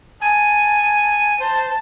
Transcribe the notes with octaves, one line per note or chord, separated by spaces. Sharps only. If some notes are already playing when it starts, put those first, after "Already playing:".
G#5 A5
C5 A5